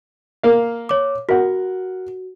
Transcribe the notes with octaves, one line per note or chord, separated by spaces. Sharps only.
A#3 F5
C#5 D6
F#4 A#4 F#5